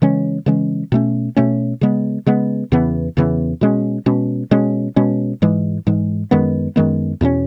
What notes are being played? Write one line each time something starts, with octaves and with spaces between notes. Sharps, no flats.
C#3 E3 G#3 C#4
C#3 E3 G#3 C#4
B2 A3 C#4
B2 A3 C#4
C#3 G#3 B3
C#3 G#3 B3
E2 C#3 E3 B3
E2 C#3 E3 B3
B2 G#3 C#4
B2 G#3 C#4
B2 G#3 C#4
B2 G#3 C#4
G#2 E3 G#3
G#2 E3 G#3
F#2 D#3 G#3 B3
F#2 D#3 G#3 B3
E2 B2 A3 C#4